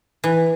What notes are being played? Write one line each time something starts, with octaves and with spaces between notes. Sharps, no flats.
E3